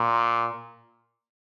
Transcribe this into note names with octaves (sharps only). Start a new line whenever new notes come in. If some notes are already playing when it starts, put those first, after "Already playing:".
Already playing: A#2